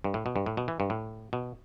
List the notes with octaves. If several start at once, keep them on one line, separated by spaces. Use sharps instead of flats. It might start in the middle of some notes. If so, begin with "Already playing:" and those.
G2
A2
B2
G2
A2
B2
E3
G2
A2
B2